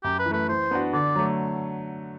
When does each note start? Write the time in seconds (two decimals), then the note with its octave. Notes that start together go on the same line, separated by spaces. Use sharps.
0.03 F#2 G4
0.19 B4
0.26 E3
0.31 A3 B4
0.49 E3 C5
0.71 B3 D4 F#4
0.93 D3 D5
1.15 F#3 A3